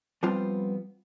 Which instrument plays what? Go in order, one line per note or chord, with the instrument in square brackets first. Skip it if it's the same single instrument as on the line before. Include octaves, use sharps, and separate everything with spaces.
[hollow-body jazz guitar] F3 G3 B3 C4 F4